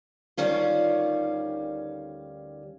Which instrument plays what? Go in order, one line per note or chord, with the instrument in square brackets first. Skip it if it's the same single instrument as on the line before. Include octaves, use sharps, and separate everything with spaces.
[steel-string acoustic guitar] D2 D#3 G3 C#4 F4